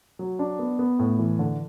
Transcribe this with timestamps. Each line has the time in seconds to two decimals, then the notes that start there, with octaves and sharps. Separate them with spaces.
0.19 F#3
0.39 D4
0.59 B3
0.79 B3
0.99 A2
1.19 E3
1.39 D3